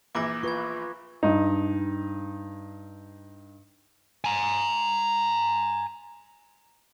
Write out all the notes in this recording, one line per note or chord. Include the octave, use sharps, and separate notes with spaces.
A#1 E3 D6 G#6 A#6
F4 B4 C#6 G#6
G2 D#4
G#5 A#5